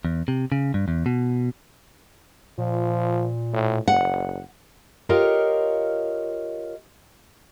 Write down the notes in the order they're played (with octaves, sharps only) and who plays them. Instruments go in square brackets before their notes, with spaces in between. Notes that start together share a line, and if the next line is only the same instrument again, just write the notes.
[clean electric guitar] E2
C3
C#3
G2
E2
B2
[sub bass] A#2 [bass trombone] F3
[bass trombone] A2
[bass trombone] F#1 [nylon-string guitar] F#5
[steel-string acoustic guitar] F4 G4 A#4 C#5 D#5 F5